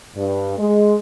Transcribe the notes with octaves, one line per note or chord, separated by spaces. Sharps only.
G2
G#3